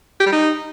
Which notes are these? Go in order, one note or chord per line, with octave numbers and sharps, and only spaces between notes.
G4
G3
D#4